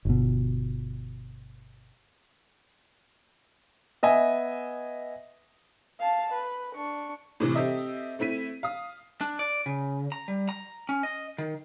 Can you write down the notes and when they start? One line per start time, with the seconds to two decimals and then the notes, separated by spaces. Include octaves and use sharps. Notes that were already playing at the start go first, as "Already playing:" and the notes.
0.05 G1 B2
4.03 B3 D#5 E5 G#5
5.99 F5 A5
6.33 B4
6.76 D4 C#6
7.40 A2 C3 E3
7.55 C4 G4 A4 D#5 E5
8.19 A3 C4 E4 B6 D#7
8.63 F5 D#6
9.21 D4
9.39 D5
9.66 C#3
10.12 A#5
10.28 G3
10.49 A#5
10.89 C#4
11.03 D#5
11.38 D#3